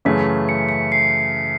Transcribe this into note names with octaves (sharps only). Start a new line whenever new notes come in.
F#2 C#3 E3 A3 B6
C#7
C#7
C7